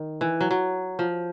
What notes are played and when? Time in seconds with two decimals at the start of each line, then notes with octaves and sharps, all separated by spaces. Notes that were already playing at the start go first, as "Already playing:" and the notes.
Already playing: D#3
0.21 E3
0.41 F#3
0.51 F#3
0.99 F3